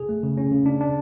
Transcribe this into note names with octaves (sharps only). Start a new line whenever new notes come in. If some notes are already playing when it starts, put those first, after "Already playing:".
Already playing: G#4
A3
C#3
C#4
C#3
D4
D4